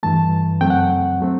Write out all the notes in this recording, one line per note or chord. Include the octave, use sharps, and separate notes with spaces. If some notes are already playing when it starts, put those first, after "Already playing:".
G2 E3 A3 A5
F#2 F#3 A3 C4 G5
F#5
F#3 A3 C4